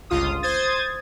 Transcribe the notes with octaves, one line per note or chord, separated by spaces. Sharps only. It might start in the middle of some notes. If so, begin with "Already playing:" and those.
G1 C#2 F4 D#6
C5 D#6 G#6 A6